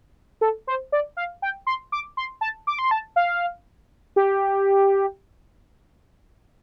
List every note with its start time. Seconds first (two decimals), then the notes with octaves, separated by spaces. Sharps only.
0.41 A4
0.67 C5
0.92 D5
1.17 F5
1.42 G5
1.67 C6
1.92 D6
2.17 C6
2.41 A5
2.67 D6
2.79 C6
2.91 A5
3.16 F5
4.16 G4